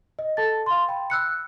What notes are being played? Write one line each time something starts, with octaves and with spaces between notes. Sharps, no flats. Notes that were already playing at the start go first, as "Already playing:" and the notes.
D#5
A4 A5 A6
F5 C6
G5 B5
E6 F#6 C#7